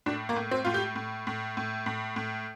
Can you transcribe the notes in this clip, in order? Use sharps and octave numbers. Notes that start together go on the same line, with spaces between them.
A2 D4
A#3
A2
C4
A2 F4
G4
A2
A2
A2
A2
A2